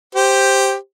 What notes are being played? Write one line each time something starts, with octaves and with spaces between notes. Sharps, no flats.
G4 C5